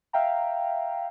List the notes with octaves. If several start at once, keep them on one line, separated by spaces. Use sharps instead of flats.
E5 F5 G5 A#5